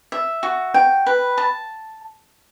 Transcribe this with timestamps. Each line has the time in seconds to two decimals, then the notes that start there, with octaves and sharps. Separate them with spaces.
0.12 E5
0.43 F#4
0.74 G5
1.06 B4
1.38 A5